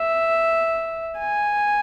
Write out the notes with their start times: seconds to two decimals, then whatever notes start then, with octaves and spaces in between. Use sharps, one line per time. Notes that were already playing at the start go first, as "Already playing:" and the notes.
Already playing: E5
1.18 G#5